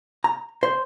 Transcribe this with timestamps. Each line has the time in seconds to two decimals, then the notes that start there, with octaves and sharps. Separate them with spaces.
0.24 A#5
0.63 C5